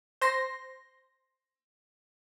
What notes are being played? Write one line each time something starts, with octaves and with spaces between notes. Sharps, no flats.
C5 C6 A#6